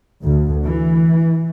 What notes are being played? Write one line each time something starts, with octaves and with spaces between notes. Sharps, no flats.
D2
E3